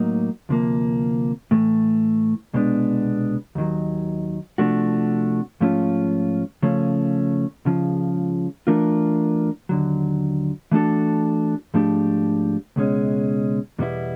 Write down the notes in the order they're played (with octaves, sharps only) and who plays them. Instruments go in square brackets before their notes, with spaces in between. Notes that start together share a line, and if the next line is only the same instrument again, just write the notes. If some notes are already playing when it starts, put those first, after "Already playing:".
Already playing: [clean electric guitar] A2 F#3 A#3 D#4
D2 C3 F3 A#3
A2 E3 A3
C2 B2 G#3 B3 D4
D#2 D#3 F#3
C3 F3 A3 D4 F#4
G#2 F3 A3 C#4 F4
C#3 F3 A3 C#4
C#2 C#3 F3
E3 A3 D4 F4 A#4
D#2 D3 F#3
E3 A3 D4 F#4 A4
G#2 F3 A3 D4 G4
C#2 B2 G#3 C#4
E2 B2 G3 B3 E4